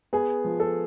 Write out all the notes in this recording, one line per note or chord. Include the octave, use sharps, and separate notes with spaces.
B3 G#4
F3
A4